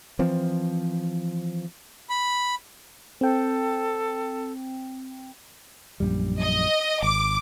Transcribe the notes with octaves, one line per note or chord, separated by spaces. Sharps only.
E3 F3 C4
B5
C4 A4 G5
A#1 F#2 G3
D#5
G#1 D6